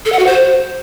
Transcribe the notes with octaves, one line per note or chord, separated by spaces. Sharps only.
A4
F#5
F#4
C5